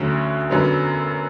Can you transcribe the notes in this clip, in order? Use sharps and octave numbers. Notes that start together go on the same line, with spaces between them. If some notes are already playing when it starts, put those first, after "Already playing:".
Already playing: D2 D3 F#3 C#4 F#4
F#2 D3 F#3 B3